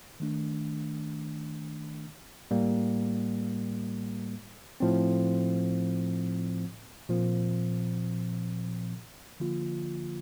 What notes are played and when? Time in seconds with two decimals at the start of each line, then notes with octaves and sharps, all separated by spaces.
0.20 D#3 A3 D4
2.51 A2 G3 A#3
4.80 A2 F3 C4
7.09 A#2 F3 C4
9.40 D3 F3 A#3 F4